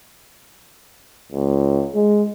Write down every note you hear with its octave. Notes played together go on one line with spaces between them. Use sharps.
C#2
G#3